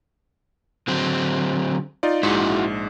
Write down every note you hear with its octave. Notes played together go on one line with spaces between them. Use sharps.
D3 F#3 C4
D#4 F4 D5
A#1 G#2 E4 F#4